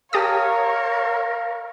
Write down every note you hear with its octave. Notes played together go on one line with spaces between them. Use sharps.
G4 A#4 C#5 F5 A5 D#6